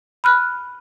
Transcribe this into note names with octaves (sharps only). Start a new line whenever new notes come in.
B5 F6 F#6